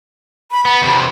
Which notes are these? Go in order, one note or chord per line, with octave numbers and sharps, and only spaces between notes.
B5
B3 B5
E2 C3